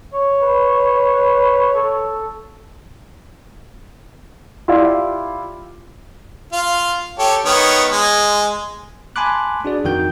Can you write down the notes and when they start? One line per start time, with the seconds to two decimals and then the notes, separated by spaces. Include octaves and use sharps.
0.14 C#5
0.42 B4
1.75 A4
4.68 E4 F4 G4 D5 F5
6.53 F4 F5
7.19 G4 A4 C#5
7.45 D#3 B3 C#5
7.91 G#3
9.16 G#5 A5 B5 C6 D6 F#6
9.65 D4 F#4 G#4 D5
9.84 F2 D#3 F#4 G5 G6